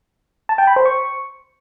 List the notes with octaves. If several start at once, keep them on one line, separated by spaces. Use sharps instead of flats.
A5
G5
B5
C5
C#6